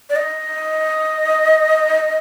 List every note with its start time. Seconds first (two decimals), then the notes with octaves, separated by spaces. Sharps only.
0.10 D5
0.16 D#5